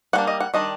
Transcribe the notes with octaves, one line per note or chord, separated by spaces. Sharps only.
G3 A#3 D4 F#5
D#5
F#5
D#3 G3 D4 D#5